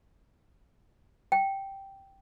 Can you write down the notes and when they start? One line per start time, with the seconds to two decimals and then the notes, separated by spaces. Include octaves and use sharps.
1.32 G5